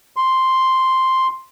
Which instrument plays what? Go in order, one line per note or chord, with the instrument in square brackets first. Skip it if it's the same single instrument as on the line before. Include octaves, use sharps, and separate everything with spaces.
[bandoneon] C6